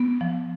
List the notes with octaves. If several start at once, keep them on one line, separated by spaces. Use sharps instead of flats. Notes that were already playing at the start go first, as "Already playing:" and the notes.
Already playing: B3
F3